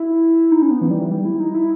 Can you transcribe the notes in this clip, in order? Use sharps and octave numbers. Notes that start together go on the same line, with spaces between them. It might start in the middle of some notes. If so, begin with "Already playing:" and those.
Already playing: E4
D#4
C#4
B3
E3
G3
E3
G3
E4
D#4
E4